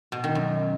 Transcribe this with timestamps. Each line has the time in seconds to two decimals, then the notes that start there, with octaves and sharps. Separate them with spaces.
0.12 B2
0.24 D#3
0.35 F#2